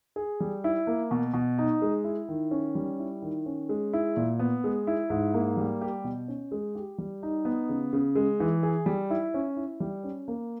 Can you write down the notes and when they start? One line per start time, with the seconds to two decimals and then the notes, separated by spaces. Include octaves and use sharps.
0.16 G#4
0.40 G3
0.64 E4
0.87 A#3
1.11 B2
1.34 B2
1.58 D#4
1.82 G#3
2.04 E4
2.28 D#3
2.51 C#4
2.75 G3
2.99 E4
3.22 D#3
3.46 C#4
3.69 G#3
3.93 E4
4.17 A#2
4.39 B3
4.64 G#3
4.87 E4
5.10 G#2
5.34 A#3
5.57 G3
5.81 G4
6.04 B2
6.28 C#4
6.52 G#3
6.75 G4
6.98 G3
7.23 D#4
7.45 B3
7.69 C#3
7.93 C#3
8.15 G#3
8.40 E3
8.63 G#4
8.86 G3
9.10 E4
9.34 C#4
9.57 E4
9.80 G3
10.04 C#4
10.28 A#3